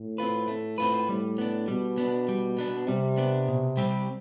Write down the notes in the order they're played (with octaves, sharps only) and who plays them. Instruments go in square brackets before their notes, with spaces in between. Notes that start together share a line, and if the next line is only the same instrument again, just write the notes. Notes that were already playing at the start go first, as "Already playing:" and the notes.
Already playing: [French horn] A2
[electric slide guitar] C4 F4 B4
A3
C4 F4 B4
[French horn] A2 [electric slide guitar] G3
[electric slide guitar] B3 D4
[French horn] B2 [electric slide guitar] G3
[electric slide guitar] B3 D4
G3
B3 D4
[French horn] C3 [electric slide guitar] G3
[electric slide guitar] B3 D4
B2
G3 C4 G4